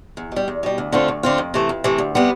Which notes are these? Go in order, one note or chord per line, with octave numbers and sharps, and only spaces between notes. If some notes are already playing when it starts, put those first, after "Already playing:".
E2
B2 G3
E2
B2 G3
D2
D3 A3 C4 F4
D2
D3 A3 C4 F4
F2
C3 E3 A3
F2
C3 E3 A3
D2
C3 G3 B3